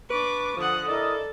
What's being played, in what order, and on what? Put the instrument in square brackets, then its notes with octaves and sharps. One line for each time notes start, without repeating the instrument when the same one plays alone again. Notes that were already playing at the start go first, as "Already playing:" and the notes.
[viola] D4 D6 [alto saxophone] B4 [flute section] C#6
[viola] D3 F#5 [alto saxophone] F3 [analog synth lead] D#6
[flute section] E4 A#4 D#5 [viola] A4 [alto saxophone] D5